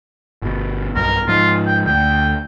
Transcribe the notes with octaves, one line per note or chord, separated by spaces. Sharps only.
G1 B2
B1 G2 B2 A#4
G#2 F3 F4
G5
D2 G5